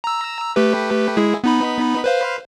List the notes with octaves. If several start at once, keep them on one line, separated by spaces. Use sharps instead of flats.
A#5 E6
A3 G4 B4
G#3 E4 G#4
B3 D#4 B5
B4 C5 F5